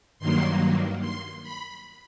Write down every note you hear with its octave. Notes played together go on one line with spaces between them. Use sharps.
G2 D#3 F#3 A#3 C6
C6
B5